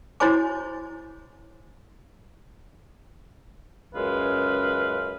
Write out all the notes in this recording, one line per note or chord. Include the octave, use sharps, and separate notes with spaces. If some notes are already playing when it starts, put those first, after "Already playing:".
E4 F#4 C5 C#5 G#5 D6
C#2 F#2 G#3 B4 F5